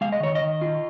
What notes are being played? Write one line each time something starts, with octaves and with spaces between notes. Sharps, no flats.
G#3 F5
D#5
D#3 C#5
D#5
D#3
F4